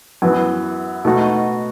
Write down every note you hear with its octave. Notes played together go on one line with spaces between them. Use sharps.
F#2 E3 B3
B2 A3 D#4 F#4